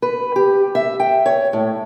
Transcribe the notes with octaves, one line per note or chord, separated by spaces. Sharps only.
B4
G4
E5
G5
C#5
A2